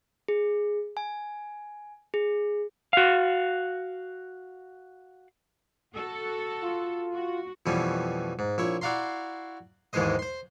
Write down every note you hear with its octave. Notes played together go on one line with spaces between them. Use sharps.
G#4
G#5
G#4
F#4 F5
F#4 A4
F4
F#4
F2 B2 E3 G3 C#4
G#2
A#1 E4 C#5
E4 F#4 D5 F5 A#5 C6
D#2 G#2 E3 G#3 C5 D#5
C5 C6